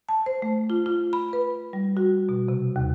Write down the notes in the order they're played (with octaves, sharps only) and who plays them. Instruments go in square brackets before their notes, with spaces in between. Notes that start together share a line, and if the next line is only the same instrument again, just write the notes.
[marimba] A5
C5
A3
F4
F4
B5
B4
G3
F#4
B2
C3
D#2